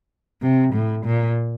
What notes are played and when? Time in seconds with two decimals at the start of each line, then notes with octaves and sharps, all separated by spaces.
0.42 C3
0.73 A2
1.05 A#2